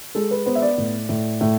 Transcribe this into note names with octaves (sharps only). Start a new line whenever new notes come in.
G#3 A4
B4
B3 C5
E5
D5
A2
A2
A2